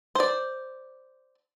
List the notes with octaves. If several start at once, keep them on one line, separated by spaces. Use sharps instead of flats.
C5 D5